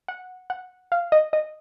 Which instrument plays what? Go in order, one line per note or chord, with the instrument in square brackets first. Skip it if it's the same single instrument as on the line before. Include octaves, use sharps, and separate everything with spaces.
[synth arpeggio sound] F#5
F#5
F5
D#5
D#5